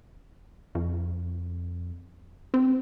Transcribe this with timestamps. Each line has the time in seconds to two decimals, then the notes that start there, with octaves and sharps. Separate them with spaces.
0.75 F2
2.54 C4